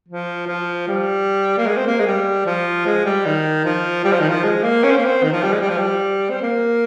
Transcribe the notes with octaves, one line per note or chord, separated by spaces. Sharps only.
F3
F3
G3
A#3
G#3
C4
A#3
G#3
G3
F3
G#3
G3
D#3
F3
G3
F3
D#3
F3
G#3
A#3
C#4
C4
A#3
C4
D#3
F3
G3
G#3
G3
F3
G3
C4
A#3